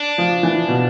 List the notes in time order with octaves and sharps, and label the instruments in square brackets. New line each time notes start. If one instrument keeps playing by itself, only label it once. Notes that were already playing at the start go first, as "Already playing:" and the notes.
Already playing: [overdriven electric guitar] D4
[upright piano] F3
E3
B2